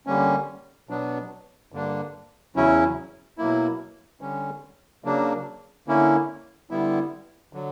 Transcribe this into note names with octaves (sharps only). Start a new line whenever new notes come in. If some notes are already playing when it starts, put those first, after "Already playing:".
D3 G3 A#3 C#4
B2 F#3 B3 D4
G2 D3 A#3 D4
E2 C#3 F#3 C#4 E4
B2 F#3 A#3 E4
D3 G3 C#4
C#3 F#3 A#3 D4
D3 A#3 C#4 E4
D3 G3 B3 E4
D3 F#3